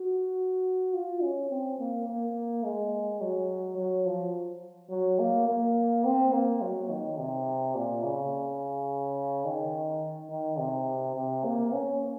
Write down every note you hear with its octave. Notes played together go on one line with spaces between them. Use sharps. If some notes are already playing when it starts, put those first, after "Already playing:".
Already playing: F#4
F4
C#4
C4
A#3
A#3
G#3
F#3
F#3
F3
F#3
A#3
A#3
C4
A#3
F#3
D#3
C3
A#2
C#3
D#3
D#3
C3
C3
A#3
C#4